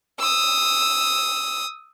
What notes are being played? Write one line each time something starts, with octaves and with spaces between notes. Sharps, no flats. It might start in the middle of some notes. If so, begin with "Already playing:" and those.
D#6 E6